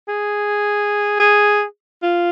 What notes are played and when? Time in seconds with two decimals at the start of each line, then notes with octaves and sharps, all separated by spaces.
0.09 G#4
1.20 G#4
2.03 F4